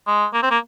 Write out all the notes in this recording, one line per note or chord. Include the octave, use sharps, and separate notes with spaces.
G#3
A#3
C4
A#3